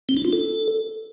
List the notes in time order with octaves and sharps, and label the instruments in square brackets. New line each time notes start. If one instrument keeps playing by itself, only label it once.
[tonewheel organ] C4
D4
F4
A4